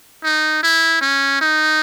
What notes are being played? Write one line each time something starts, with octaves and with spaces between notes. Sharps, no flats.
D#4
E4
C#4
D#4